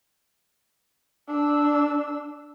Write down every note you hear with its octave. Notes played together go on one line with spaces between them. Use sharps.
D4 E6